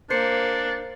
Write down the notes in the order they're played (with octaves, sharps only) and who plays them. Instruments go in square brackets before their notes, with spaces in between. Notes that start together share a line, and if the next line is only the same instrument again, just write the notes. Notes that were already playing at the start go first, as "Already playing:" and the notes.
[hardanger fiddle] A#3 [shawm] D4 [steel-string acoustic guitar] C5 [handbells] G6 C7 C#7